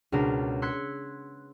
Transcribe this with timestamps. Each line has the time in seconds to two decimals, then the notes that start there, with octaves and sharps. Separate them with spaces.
0.12 C#2 B2 D4 A#4
0.62 C6 E6 F#6 G#6 B6 C#7